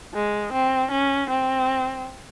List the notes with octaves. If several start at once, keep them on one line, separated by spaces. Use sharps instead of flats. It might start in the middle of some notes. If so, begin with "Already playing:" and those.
G#3
C4
C#4
C4